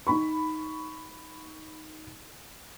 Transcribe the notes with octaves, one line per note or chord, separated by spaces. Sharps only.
D#4 B5 C#6